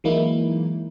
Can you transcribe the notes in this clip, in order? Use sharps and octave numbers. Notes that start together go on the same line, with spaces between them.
E3 F#3 G#3 A#3 D#4 E4